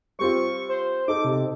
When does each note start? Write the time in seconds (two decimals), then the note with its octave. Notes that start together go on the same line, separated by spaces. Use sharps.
0.19 G3 C4 F4 C#6
0.69 C5
1.08 D#4 A4 D6
1.24 C3